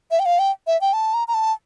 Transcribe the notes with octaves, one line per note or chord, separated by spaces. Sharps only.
E5
G5
F5
G5
E5
G5
A5
A#5
A#5
A5